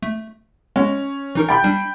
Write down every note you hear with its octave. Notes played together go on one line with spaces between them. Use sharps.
A3
G#3 C#4
E3 D#4 A#4
G5 B5 G6 A6
G3 D4